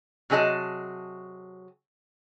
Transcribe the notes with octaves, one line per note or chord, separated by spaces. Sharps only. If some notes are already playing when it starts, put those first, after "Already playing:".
C3 F#3 G#4 D#5 A5